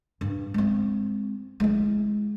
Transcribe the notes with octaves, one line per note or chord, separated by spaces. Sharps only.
G2
G#3 C4
G#3 E4